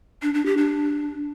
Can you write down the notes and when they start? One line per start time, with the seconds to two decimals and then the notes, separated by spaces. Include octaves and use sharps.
0.22 D4
0.34 D4
0.46 G4
0.57 D4